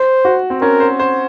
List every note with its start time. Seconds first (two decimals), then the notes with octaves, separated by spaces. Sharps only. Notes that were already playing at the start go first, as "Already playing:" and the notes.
Already playing: C5
0.25 F#4
0.50 C4
0.61 C#4 A#4
0.80 C5
0.99 C5